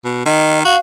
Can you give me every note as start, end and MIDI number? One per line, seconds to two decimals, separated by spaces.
0.04 0.21 47
0.26 0.60 51
0.26 0.59 75
0.65 0.76 66
0.65 0.79 77